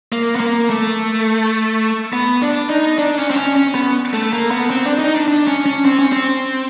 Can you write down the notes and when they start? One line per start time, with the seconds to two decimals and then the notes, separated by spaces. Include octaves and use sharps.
0.12 A#3
0.36 B3
0.40 A#3
0.70 A3
2.13 B3
2.42 D4
2.70 D#4
2.98 D4
3.17 C#4
3.30 C4
3.36 C#4
3.56 C#4
3.75 B3
4.13 A3
4.33 A#3
4.51 B3
4.70 C4
4.85 D4
4.99 D#4
5.14 D4
5.28 D4
5.48 C#4
5.66 C#4
5.85 C4
5.99 C#4
6.12 C4